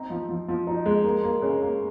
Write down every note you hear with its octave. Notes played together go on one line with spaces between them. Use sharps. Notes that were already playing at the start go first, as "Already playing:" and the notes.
Already playing: C4 D#4
F3
F3
F3
D#4
G#3
A#3
A#3
C#3
A#3